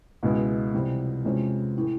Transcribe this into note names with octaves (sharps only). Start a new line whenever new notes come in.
C#2 B2 G#3 B3 E4
F2 C3 E3 G3
E2 C3 F3 G#3 C#4
A2 E3